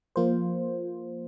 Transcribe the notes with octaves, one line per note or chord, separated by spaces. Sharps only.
F3 A#3 F4 C5